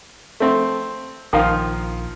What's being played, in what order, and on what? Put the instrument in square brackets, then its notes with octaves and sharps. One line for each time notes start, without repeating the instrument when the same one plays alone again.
[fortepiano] A3 C4
[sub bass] A#1 [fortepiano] D#3 F3 F4